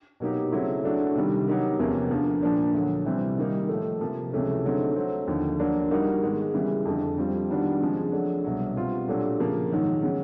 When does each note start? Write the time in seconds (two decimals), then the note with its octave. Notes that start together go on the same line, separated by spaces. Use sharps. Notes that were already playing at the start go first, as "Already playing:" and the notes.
0.20 B2 F#3 A#3 D#4 G4
0.52 C#3 F#3 A3 C4 E4
0.84 F#3 A3 D4 F#4
1.16 C3 D#3 G3
1.47 F#3 B3 D#4 G4 A#4
1.79 E2 C3 F3 A#3 C#4
2.10 D2 D3 F3 A#3
2.42 A#2 F3 A#3 D4
2.74 D2 D3 F#3
3.06 C3 E3 G3 C4
3.37 D#3 G3 A#3 D#4
3.69 A2 F3 A3
4.01 C3 F3 A#3
4.33 C#2 C3 E3 A3 C#4
4.65 D3 F#3 A3 C4 D#4
4.96 F#3 A3 C4
5.27 D#2 D3 F3
5.59 F#3 A#3 D4
5.91 G3 A#3 D#4 F#4 A#4
6.23 G#2 D#3 G#3 B3
6.54 C#3 E3 G3
6.85 F2 D3 F3
7.17 G3 C4 F4
7.50 D#3 G3 B3 D4 F#4
7.81 C#3 F3 G#3 C4
8.12 F#3 A3 D4
8.44 C2 B2 F#3
8.76 B2 G3 C4 F4
9.08 A#2 F#3 A3 D4 G4
9.39 C#3 F3 A#3
9.71 G#2 D#3 F#3
10.03 C#3 F#3